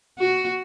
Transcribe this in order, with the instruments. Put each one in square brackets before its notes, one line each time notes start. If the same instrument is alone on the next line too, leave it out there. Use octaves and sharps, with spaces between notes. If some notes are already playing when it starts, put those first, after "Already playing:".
[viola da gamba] F#4